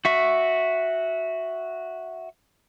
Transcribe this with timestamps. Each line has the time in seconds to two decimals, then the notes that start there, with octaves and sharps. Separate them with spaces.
0.05 F#4 E5 C#6